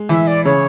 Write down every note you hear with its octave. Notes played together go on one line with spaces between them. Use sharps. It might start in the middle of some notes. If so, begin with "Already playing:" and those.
Already playing: G#3
E3 E5
D5
C#3 C#5